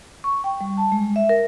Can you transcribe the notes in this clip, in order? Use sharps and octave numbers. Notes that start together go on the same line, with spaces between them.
C#6
G5
G3
A5
G#3
E5
A#4